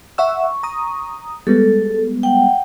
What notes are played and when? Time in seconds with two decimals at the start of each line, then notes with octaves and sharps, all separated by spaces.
0.18 E5 F#5 C#6 E6
0.63 A#5 D#6
1.47 G3 G#3 B3 A4
2.23 F#5 G5